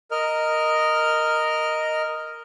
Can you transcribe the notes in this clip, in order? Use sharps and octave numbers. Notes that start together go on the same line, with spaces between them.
A#4 D#5 F6